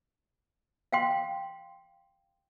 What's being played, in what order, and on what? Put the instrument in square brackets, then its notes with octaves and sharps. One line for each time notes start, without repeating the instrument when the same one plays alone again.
[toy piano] F5 G5 C6